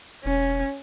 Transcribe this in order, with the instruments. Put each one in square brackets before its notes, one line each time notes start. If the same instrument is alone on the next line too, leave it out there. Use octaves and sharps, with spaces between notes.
[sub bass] E1 [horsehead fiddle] C#4